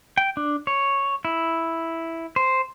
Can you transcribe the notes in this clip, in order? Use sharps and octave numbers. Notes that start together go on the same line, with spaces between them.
G5
D4
C#5
E4
C5